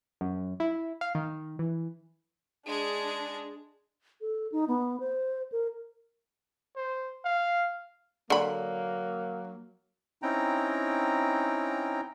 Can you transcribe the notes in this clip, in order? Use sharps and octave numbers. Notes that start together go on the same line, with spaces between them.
F#2
E4
F5
D#3
E3
G#3 D4 G#4
A4
D#4
B3
C5
A#4
C5
F5
D3 F#3 A#3 B5
C4 C#4 D#4 E4 G5 A#5